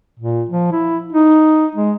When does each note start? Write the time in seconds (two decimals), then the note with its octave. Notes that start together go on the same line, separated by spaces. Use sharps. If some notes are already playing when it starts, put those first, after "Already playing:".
0.19 A#2
0.49 F3
0.71 E4
1.12 D#4
1.75 G#3